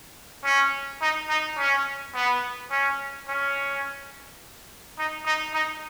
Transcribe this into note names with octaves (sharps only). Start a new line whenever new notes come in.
C#4
D#4
D#4
C#4
B3
C#4
C#4
D#4
D#4
D#4